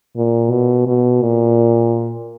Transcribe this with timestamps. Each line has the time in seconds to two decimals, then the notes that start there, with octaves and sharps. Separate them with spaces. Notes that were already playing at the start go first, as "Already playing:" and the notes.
0.16 A#2
0.51 B2
0.87 B2
1.22 A#2